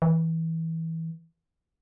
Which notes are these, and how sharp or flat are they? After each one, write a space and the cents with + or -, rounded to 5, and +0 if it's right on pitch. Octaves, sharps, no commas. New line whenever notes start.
E3 -20